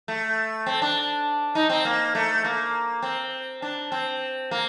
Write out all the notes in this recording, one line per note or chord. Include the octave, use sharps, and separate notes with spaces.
A3
C4
D4
D#4
C4
A#3
A3
A#3
C4
D4
C4
A#3